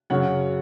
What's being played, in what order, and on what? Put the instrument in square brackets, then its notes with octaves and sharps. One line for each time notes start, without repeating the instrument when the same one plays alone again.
[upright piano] F#2 C#3 F#3 C#5 F#5